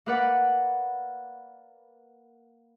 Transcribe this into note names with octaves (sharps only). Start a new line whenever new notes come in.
A#3 A#4 B4 D5 F#5